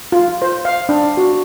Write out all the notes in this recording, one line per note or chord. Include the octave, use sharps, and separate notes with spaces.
F4
C5
F5
D4
F#4